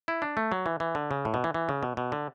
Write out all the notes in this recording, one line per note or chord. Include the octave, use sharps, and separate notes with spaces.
E4
D4
A3
F#3
E3
E3
D3
C#3
A2
B2
E3
E3
C#3
B2
B2
D3